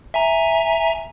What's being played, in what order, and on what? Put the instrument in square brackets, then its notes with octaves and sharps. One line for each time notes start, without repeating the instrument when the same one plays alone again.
[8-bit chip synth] E5 G#5 A#5